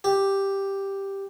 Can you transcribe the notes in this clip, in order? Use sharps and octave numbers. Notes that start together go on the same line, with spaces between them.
G4